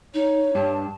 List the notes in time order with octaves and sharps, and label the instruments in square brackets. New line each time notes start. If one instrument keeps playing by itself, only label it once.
[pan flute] D#4 [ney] C#5
[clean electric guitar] G2 [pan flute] A5